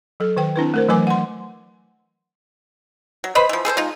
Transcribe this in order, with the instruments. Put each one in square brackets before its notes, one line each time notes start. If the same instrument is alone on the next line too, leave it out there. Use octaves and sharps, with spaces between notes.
[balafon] F#3 A4
D#3 B4 G5
C4 D4 E4 B4
A3 A#4 C5
E3 F#3 A3 B4 G#5 D6
F#5 C6
[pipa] F#3
B4 C5 D#5 B5
E3 F3
G#4 A4 B4 C5
G#3 D#4 F4